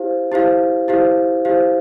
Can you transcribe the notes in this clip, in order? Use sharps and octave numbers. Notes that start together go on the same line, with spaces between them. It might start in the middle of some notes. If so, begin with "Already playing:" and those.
Already playing: E4 G4 C5 F5
E4 G4 C5 F5
E4 G4 C5 F5
E4 G4 C5 F5